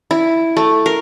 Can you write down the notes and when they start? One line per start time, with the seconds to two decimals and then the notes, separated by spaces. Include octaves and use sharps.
0.11 E4
0.57 A3
0.86 A#4